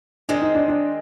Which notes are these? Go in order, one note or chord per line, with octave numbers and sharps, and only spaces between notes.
D#3 G#3 C4 D4
D#4
D4
D4